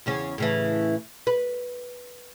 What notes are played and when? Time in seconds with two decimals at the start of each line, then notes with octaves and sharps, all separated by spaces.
0.06 E2 C#3 C#4
0.38 A2 C#3 E3
1.27 B4